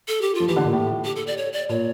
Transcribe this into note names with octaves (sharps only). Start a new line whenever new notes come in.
A4
G4
F4
F3
E3 G4
D3
A#2
A2
G4
A4
D5
C#5
D5
A#2 C#5